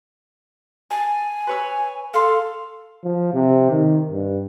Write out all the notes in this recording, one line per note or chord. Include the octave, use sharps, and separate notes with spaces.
G#5 A5
B4 C#5 E6
A4 F5 C6
F3
C3
D#3
G2